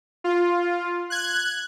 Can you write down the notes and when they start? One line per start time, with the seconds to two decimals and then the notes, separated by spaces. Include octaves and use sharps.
0.24 F4
1.10 F#6 G#6